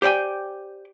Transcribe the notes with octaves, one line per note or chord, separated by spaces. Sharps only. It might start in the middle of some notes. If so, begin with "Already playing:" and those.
G4 C5 D5 G5 G#5